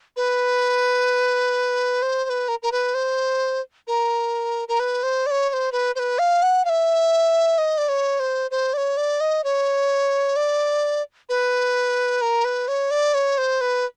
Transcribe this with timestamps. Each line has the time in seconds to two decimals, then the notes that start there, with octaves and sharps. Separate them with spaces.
0.17 B4
2.02 C5
2.25 C5
2.30 B4
2.48 A#4
2.63 A#4
2.72 B4
2.94 C5
3.87 A#4
4.68 A#4
4.80 B4
5.03 C5
5.26 D5
5.31 C#5
5.49 C#5
5.53 C5
5.72 B4
5.96 C5
5.99 B4
6.19 F5
6.43 F#5
6.65 F5
6.69 E5
7.58 D#5
7.78 D5
7.89 C#5
8.20 C5
8.51 C5
8.74 D5
8.77 C#5
8.97 D5
9.20 D#5
9.44 C#5
10.36 D5
11.29 B4
12.22 A#4
12.45 B4
12.68 C#5
12.91 D5
13.14 C#5
13.38 C5
13.61 B4